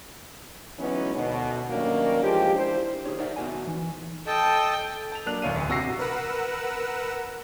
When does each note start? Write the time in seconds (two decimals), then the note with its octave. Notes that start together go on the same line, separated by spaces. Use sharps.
0.78 E3 F#3 G#3 B3 C#4 D#4
1.15 D2 B2
1.70 G2 D#3 F#3 A#3 C#4 D4
2.23 E3 F3 G#3 G4
2.55 D4 E4 A#4 C5
3.05 D#4 G4 G#4 C#5
3.19 A#4 C5 D5 E5 F#5
3.36 B3 D#4 F#4 A#4 E5 G#5
3.67 E3
4.27 A4 D#5 G5 A5
5.12 A5 F7
5.26 F#3 A#3 D4 F#6 F7
5.42 D1 D2 C#5 F5 D#7
5.54 A1 D2
5.69 C3 F#4 E6 A#6 C7
5.99 A#4 B4 F#5 E6